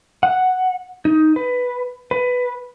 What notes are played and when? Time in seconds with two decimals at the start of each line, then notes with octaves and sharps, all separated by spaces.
0.23 F#5
1.05 D#4
1.36 B4
2.11 B4